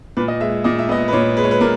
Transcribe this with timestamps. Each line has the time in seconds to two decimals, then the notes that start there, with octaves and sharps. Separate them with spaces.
0.17 A#2 B4
0.28 D#5
0.40 G#3 E5
0.64 A#2 D#5
0.79 E5
0.89 B3 D#5
1.08 B4
1.12 A#2 C#5
1.37 G#3 B4
1.44 C#5
1.51 B4
1.61 A#2 A#4